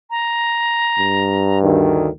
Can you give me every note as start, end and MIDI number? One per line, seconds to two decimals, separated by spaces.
0.10 1.59 82
0.99 2.16 43
1.63 2.08 38
1.63 2.08 51